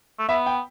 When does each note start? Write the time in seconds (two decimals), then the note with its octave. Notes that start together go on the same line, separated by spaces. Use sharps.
0.19 A3
0.29 B3 E5
0.46 G5